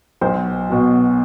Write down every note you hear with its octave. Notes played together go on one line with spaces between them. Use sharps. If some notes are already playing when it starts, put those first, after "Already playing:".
B1 C5
B2 F#3